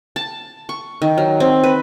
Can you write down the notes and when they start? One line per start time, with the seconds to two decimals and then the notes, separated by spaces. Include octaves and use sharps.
0.16 A5
0.69 C#6
1.02 D#3
1.18 F#3
1.40 C4
1.63 B4